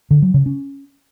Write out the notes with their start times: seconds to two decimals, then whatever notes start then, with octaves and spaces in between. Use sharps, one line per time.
0.11 D3
0.22 F#3
0.34 C#3
0.46 C#4